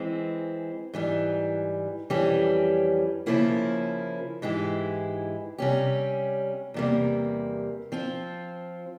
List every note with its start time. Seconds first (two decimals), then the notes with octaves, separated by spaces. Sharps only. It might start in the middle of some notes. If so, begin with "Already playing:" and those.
Already playing: E3 G#3 C4
0.94 G#2 E3 G3
2.10 F2 E3 G3 C#4 G4
3.26 C#3 F3 A#3 C#4 E4
4.42 G#2 E3 G#3 E4 G4
5.58 C3 G3 C#4 G4
6.74 E2 C3 G3 A#3
7.92 F3 C4 F4